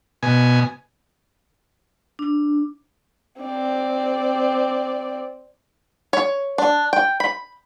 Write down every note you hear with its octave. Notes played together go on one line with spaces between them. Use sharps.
B2 G#5
D4
C4 D5
C#5
D4
G5
B5